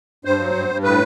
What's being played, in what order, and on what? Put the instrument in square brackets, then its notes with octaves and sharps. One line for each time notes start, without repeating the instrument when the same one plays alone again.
[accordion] G2 C5
F#3
G2
G2
A2 B4